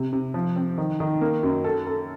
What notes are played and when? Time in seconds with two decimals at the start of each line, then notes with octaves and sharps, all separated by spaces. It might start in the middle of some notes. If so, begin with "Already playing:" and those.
Already playing: C3
0.13 C3
0.34 F3
0.56 C4
0.78 D#3
1.00 D#3
1.21 A#3
1.43 F#2
1.64 A4
1.87 A4